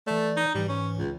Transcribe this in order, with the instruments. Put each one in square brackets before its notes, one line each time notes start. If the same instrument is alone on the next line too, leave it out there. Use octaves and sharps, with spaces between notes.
[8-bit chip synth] E3 D5 [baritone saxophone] A3
[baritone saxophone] D#4
[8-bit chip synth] G#2 E3 [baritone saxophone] G3
[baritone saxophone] C#4
C#2